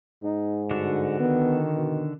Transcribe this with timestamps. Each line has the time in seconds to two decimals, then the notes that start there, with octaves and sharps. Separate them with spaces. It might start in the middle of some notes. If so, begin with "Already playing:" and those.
0.23 G#2 D#4
0.71 G2 D3 D4 F#4
1.20 D#3 B3
1.75 B2